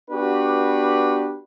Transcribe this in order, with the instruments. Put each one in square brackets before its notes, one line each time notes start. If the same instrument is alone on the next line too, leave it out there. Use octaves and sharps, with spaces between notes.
[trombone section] B3 D4 F#4 G4 B4